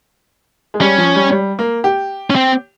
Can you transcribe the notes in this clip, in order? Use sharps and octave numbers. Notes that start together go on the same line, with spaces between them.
G#3
G3 C#4
F3
G3
G3
A#3
G4
C#4
C4